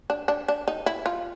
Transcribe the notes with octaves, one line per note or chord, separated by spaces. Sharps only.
D4
D4
D4
D#4
E4
F4